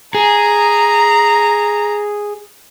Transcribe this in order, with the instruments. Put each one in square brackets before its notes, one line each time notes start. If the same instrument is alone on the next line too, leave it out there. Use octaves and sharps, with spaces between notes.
[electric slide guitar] G#4 [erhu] A#5